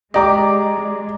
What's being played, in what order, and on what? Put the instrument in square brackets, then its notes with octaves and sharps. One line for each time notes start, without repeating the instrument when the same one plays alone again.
[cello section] G#3 [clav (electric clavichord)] G4 D#5 [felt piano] D5 A#5 D6